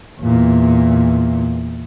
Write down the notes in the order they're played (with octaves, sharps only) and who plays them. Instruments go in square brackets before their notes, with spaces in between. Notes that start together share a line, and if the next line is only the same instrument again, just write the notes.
[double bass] E2 A#2